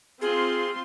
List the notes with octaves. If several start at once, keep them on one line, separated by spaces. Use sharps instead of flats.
C4 F4 G#4 C6